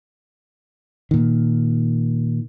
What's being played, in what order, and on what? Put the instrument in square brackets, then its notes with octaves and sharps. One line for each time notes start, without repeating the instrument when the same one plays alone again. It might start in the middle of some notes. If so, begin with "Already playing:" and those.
[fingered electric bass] A#2 D#3